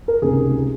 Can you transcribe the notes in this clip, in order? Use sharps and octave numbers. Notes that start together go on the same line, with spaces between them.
A#4
C#2 C3 D#3 G#4